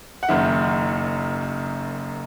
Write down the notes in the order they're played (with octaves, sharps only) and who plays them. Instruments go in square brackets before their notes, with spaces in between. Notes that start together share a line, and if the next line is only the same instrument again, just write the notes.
[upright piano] F#5
F#1 F#2 D#3 E5